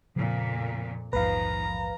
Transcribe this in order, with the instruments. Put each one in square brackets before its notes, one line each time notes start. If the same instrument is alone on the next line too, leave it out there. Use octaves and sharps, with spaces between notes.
[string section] F2 A#2 [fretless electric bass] C#3 F3
[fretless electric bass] A#1 E2 G#2 [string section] D#3 F3 [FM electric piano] B4 F5 [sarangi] A#5